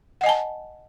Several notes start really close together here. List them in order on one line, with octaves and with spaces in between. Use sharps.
F#5 D#5 G#5 A5